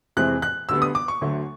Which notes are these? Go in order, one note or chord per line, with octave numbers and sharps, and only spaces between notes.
F2 C3 E3 G#3 C4 F#6
F#6
D2 D3 G3 B3 E6
D#6
D6
C#6
D2 D3 F#3 A3